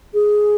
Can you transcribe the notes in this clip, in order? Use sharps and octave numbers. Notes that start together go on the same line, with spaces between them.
G#4